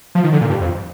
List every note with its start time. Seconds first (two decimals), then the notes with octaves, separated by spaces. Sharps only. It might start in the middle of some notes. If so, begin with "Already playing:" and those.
0.15 F3
0.24 D#3
0.33 D3
0.41 A#2
0.50 G2
0.61 F2